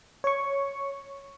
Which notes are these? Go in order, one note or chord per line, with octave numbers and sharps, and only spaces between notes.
C#5 C#6